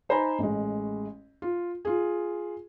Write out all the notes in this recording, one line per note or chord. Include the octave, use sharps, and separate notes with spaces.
D#4 C5 G#5 A#5 B5
A1 G#3
F4
F4 G#4